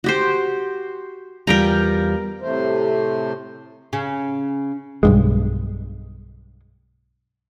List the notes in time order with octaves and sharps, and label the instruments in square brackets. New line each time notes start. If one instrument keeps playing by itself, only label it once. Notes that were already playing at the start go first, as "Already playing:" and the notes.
[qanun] F#4 G4 C5
[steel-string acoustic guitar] E2 G3 F4 [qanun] A#4 G5 A#5
[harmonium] A2 C3 A3 C5
[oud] C#3
[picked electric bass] B1 G2 G#3